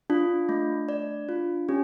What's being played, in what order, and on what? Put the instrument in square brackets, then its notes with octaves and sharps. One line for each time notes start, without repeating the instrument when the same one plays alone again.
[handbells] D4 [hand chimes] F4
[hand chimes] A3
D5
F4
[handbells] C#4 [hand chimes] G4